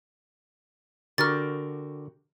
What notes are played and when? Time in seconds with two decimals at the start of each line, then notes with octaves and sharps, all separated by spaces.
1.18 D3 F#4 G4 A#4 F6 A6